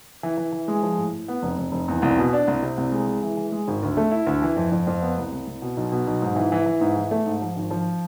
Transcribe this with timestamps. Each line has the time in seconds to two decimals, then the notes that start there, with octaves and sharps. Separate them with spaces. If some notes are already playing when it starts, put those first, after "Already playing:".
0.23 E3
0.37 E3
0.52 E3
0.68 G#3
0.83 F3
0.97 A2
1.12 A2
1.28 B3
1.43 F1
1.58 F1
1.72 F1
1.88 E2
2.02 C2
2.18 B2
2.33 D4
2.48 C2
2.62 C3
2.78 C2
2.92 G#3
3.07 G#3
3.23 E3
3.37 E3
3.52 G#3
3.68 G#1
3.83 D2
3.97 A3
4.11 E4
4.26 D2
4.42 E3
4.56 F2
4.72 F2
4.87 F2
5.02 B3
5.17 C2
5.32 C2
5.47 C2
5.62 B2
5.77 B1
5.92 B2
6.07 B1
6.22 G#2
6.36 E3
6.52 E3
6.66 E3
6.81 G#2
6.97 E3
7.11 A3
7.26 G#2
7.42 F3
7.57 G#1
7.71 F3